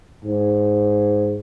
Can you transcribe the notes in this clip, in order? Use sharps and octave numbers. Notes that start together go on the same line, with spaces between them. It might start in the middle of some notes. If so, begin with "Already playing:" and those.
G#2